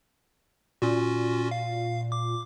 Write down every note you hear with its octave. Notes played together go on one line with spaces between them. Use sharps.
A#2 C#4 F4 F#4
F5
D6